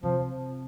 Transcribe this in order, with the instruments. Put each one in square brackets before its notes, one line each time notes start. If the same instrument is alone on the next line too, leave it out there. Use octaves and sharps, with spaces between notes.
[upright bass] C3 [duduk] F3